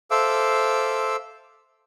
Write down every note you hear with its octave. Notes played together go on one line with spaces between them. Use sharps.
A4 C5 E5 F5 D6 E6